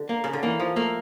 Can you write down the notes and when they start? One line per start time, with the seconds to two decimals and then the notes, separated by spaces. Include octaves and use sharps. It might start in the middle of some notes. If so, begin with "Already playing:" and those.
Already playing: D3
0.09 A#3
0.24 C#3
0.33 D3
0.43 E3 A#3
0.60 F3
0.76 A3 A#3